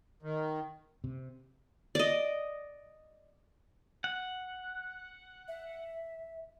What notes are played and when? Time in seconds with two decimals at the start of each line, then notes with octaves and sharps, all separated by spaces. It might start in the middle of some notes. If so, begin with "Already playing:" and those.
0.22 D#3
1.04 C3
1.95 D5 D#5
4.04 F#5
5.48 E5